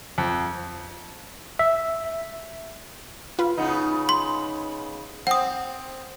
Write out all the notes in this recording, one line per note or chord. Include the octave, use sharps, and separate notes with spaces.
F2
E5
F4 B4
C#3 B3 D#4
C6
C4 F#5 D#6